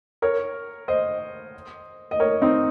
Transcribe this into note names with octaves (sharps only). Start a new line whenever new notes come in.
A#4 C#5
C5 D#5
D#5
A#4 C#5
C4 D#4